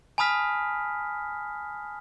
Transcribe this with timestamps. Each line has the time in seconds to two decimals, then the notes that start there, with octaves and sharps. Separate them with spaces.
0.18 G#5 A5 B5 D#6 F6 B6